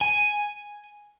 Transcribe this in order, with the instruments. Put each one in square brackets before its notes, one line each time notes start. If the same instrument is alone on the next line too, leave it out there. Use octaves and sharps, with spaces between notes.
[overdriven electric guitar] G#5